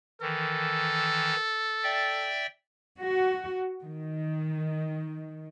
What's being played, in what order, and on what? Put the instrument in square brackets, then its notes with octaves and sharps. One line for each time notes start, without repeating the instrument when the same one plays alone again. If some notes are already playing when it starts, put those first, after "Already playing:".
[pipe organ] D#3 E3 [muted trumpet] A4
[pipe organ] D5 E5 G5
[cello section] F#4
D#3